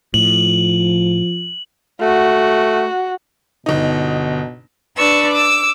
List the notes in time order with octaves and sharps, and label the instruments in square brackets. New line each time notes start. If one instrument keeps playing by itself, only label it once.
[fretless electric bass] A2 [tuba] F3 [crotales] F#7
[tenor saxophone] A3 [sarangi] F#4
[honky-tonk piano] G1 D#4 [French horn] B2
[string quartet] D4 B4 D5 C#6 E6
D6 E6